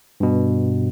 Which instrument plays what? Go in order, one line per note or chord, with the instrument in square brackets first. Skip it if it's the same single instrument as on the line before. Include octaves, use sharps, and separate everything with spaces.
[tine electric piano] G2 B2